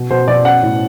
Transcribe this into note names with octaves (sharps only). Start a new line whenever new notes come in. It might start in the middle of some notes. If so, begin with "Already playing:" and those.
Already playing: B2
B2 C5
B2 D5
C#4 F#5
A2